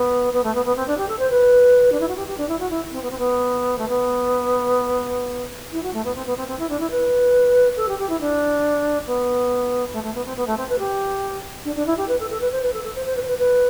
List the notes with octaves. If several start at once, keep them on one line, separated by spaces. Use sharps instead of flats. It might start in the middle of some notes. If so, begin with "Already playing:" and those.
Already playing: B3
B3
A3
B3
B3
C4
D4
G4
A4
C5
B4
D4
E4
F#4
G4
G4
D4
E4
F#4
E4
C4
B3
C4
B3
A3
B3
E4
F#4
A3
B3
C4
B3
C4
C4
E4
D4
E4
B4
A4
G4
G4
E4
D4
B3
A3
A3
B3
C4
B3
A3
C4
B4
G4
D4
D4
E4
G4
B4
A4
A4
B4
C5
B4
A4
A4
C5
C5
B4
C5
B4
B4